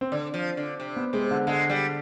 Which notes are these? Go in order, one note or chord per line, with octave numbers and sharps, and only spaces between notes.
C4
D3 D4
F3
D3
C3
B3
C3 G#3
D3
D3 G#3
G3